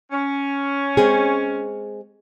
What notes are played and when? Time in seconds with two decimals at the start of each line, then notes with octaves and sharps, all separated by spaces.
0.12 C#4
0.97 G#3 C4 G#4